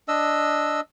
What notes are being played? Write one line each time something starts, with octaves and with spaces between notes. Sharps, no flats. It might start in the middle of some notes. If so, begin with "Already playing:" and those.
D4 D#5 E6